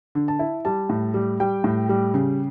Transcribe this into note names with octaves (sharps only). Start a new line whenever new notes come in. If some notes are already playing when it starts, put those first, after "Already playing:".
D3
A5
E4
G3 A5
A2
G3
G3 G5
A2
G3
C#3